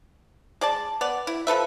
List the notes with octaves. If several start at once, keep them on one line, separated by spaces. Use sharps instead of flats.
G#3 D5 A5
B3 D5
E4
F3 A4 B4 E5